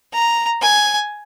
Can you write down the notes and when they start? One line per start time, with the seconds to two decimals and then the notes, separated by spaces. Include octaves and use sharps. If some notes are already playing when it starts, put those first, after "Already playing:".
0.13 A#5
0.62 G#5